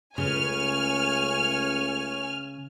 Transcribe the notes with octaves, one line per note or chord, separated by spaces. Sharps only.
C#2 C#3 A3 B4 C#5 G#5 F6